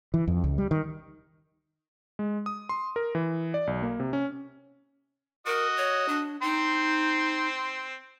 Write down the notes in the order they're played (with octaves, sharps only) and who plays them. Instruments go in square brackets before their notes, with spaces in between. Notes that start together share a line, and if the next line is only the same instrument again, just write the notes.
[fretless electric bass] E3
F2
C#2
G3
D#3
[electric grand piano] G#3
D#6
C6
A#4
E3
D5
B1
A#3
C3
C#4
[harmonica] F#4 D#5 [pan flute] A#4
[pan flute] C#5
D4
[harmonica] C4 C5 [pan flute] D#4